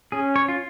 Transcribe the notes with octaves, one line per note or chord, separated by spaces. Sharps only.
C#4 G#4
C#5
F4